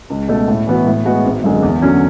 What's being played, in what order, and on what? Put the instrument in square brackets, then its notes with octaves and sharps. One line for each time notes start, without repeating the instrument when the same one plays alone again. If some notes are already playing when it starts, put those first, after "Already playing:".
[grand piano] C#2
B2 A3
A2
E3 B3 F#4
A2
G#3 B3 F#4
G#1
F#2 D3 G#3
E2
D3 F#3 C#4